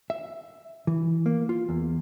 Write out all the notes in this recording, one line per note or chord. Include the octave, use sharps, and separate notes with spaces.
E5
E3
A#3
F4
E2